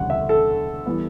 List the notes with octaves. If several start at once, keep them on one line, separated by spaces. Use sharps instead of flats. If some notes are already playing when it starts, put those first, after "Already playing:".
Already playing: E1 D2 C#3 G3 F#5
E5
A4
E3 G3 B3